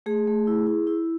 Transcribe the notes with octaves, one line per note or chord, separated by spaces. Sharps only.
A3 G#4
A3
E4
E4
E4